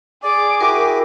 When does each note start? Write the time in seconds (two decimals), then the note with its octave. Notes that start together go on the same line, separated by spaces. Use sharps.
0.23 G#4 D5 D6
0.61 E4 F#4 G4 A#4